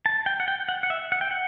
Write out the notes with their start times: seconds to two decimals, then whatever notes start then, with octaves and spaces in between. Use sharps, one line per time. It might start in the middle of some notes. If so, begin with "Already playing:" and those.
0.06 A5
0.26 G5
0.40 F#5
0.48 G5
0.69 F#5
0.83 F#5
0.90 E5
1.12 F#5
1.21 G5
1.31 F#5